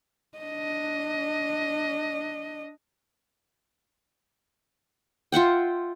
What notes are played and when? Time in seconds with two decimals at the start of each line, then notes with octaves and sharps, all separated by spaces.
0.39 D4 D#5
5.32 F4 E5 F#5 G5